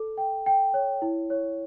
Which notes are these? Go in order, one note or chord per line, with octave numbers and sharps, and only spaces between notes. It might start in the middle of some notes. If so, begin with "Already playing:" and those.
Already playing: A4
G5
G5
C#5
E4
C#5